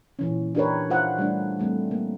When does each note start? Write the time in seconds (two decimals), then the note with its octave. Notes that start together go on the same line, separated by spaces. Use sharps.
0.19 A#2 E3 C#4
0.55 D4 D#4 G4 A#4 B4 C#5
0.90 F4 C5 E5 F#5
1.18 G3 A3 D4
1.59 G3 A3 C4
1.91 A#3